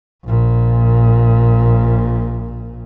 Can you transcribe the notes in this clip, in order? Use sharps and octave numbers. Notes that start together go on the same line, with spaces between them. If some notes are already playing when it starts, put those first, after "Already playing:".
A#1 A#2